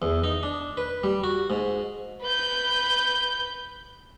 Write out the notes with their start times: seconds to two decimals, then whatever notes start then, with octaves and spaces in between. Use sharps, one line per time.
0.02 E2
0.24 D#4
0.43 D4
0.77 B4
1.04 G3
1.24 F#4
1.50 G#2
2.22 B4 G6